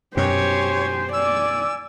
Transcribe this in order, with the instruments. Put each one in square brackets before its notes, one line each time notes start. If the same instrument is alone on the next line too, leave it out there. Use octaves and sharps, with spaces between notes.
[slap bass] F#2 B2 [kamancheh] G4 G#5 [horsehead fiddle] C5 [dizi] C#5
[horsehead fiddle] D5 [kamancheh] G#5 [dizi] E6